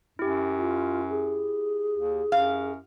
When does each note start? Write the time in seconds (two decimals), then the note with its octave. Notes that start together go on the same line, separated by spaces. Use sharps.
0.19 F#2 E4 G4
0.58 F4
1.10 G#4
1.97 D#2
2.32 F#2 F5